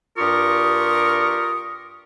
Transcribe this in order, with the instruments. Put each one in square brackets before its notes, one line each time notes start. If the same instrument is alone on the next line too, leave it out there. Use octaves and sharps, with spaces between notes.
[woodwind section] G2 F4 G4 A#4 C#6 D#6